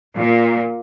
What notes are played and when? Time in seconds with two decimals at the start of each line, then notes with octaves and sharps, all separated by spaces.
0.16 A#2